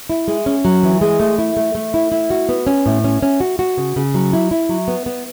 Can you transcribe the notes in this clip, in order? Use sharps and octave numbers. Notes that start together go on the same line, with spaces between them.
E4
G#3
C#4
F#3
E3
G#3
A3
E4
A3
A3
E4
E4
F#4
B3
C#4
A2
C#4
C#4
F#4
F#4
C#3
C#3
F#3
E4
E4
F#3
B3
B3